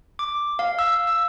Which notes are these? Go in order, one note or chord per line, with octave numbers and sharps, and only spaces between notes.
D6
F5
E6
E6